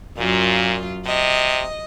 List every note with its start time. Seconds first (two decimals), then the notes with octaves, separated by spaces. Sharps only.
0.18 F#2 A#2 F4
1.06 C3 D#5